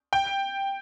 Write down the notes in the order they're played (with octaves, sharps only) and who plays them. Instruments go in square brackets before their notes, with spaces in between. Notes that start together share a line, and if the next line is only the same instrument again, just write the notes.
[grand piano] G5